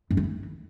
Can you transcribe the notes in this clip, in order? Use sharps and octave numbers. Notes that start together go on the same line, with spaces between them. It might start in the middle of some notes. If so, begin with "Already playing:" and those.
F#2
A3
E3